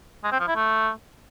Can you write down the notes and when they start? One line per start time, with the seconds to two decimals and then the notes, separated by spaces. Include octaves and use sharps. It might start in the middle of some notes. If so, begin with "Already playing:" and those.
0.24 G#3
0.32 C4
0.40 F3
0.48 E4
0.56 A3